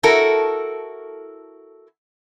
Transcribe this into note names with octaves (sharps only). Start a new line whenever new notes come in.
E4 F#4 A4 A#4